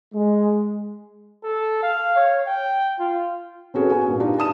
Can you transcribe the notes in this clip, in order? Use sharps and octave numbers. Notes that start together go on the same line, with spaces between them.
G#3
A4
F5
C#5
G5
F4
C4 C#4 F#4 G#4 A4 B4
B3 F#4 G#5
G2 A#2
D4 D#4 F4 G4
A5 D#6 E7